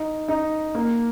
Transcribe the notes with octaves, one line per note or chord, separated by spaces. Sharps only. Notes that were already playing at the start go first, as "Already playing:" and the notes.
Already playing: D#4
D#4
A#3